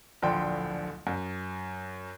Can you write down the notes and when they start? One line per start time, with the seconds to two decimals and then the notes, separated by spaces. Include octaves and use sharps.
0.22 D1 A#1 D3 F3 G5 C6
1.07 F#2